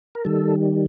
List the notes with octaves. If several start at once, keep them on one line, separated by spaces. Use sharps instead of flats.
A#4
D#3 G3 A4